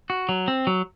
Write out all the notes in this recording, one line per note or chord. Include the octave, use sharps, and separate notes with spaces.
F#4
F#3
C4
F#3